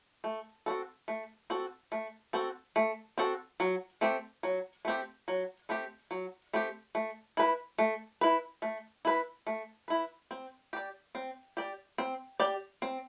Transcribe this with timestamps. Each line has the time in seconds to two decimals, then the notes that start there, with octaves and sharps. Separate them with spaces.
0.24 A3
0.66 C4 F#4 A4
1.08 A3
1.50 C4 F#4 A4
1.92 A3
2.33 C4 F#4 A4
2.76 A3
3.18 C4 F#4 A4
3.60 F#3
4.01 A3 C4 G4
4.43 F#3
4.85 A3 C4 G4
5.28 F#3
5.69 A3 C4 G4
6.11 F#3
6.53 A3 C4 G4
6.95 A3
7.37 E4 B4
7.78 A3
8.21 E4 B4
8.62 A3
9.05 E4 B4
9.47 A3
9.88 E4 B4
10.31 C4
10.73 G4 D5
11.15 C4
11.57 G4 D5
11.98 C4
12.40 G4 D5
12.82 C4